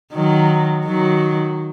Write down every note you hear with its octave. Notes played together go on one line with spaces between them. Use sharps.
D#3 F#3
D#3 F#3